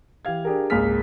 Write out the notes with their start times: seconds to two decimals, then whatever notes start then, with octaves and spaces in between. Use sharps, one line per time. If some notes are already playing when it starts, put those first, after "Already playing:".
0.25 E3 G4 F5 G#6
0.45 D4 G4 G#4 A#4
0.70 G#1 C#2 A#3 G#4 F6 B6